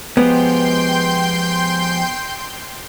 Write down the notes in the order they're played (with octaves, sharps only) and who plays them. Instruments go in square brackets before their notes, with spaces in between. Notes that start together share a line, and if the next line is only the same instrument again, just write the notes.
[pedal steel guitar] F3 G#3 G4 [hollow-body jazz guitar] B3 [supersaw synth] G5 C6 G6